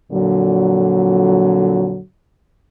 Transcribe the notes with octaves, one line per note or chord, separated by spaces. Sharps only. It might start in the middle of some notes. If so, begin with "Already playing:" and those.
F2 A#2 D3 F#3